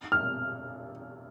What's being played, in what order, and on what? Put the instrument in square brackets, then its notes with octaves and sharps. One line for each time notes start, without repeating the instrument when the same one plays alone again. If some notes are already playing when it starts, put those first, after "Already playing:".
[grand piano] F6